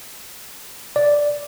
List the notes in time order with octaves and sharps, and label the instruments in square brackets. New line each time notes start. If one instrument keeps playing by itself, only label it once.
[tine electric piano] D5